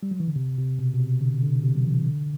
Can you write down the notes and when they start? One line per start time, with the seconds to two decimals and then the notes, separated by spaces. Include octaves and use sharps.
0.03 G3
0.11 F#3
0.20 E3
0.28 D3
0.36 C3
0.58 C3
0.79 B2
0.93 B2
1.00 C3
1.21 D3
1.43 D3
1.55 B2
1.64 C3
1.75 F#3
1.85 E3
2.06 D3